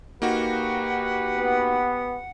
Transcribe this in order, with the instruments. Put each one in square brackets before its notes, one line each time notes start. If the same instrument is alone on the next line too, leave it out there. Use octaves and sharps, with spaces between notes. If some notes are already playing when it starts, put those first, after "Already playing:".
[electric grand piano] A#3 D#4 F#4 [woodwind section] G4 B4 F#5
[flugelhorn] B3